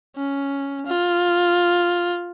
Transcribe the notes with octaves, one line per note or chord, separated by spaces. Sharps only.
C#4
F4